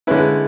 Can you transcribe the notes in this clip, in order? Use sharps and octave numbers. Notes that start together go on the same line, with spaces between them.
D3 G#3 C#4 E4 B4